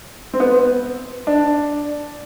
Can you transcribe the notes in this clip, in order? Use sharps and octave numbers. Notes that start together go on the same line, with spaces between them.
C4
B3
D4